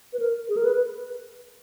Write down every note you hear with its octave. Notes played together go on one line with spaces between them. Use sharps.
B4
A#4
G#4
A#4
B4